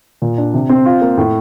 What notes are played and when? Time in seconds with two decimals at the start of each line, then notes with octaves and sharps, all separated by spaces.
0.22 A#2
0.38 D4
0.54 C3
0.69 C4
0.86 F4
1.01 A#3
1.18 A2